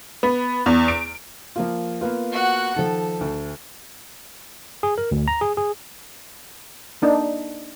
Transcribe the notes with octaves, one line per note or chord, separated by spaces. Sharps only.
B3
E2
D7
F3 A#3 F4
A#3 B3 F4
F#4 F#5
D#3 F3 A4
D2
G#4
A#4
D2
A#5
G#4
G#4
A#3 D4 D#4